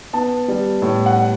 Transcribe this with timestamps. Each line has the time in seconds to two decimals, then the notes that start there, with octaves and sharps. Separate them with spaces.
0.13 B3 A5
0.48 G3
0.82 A2
1.06 F#5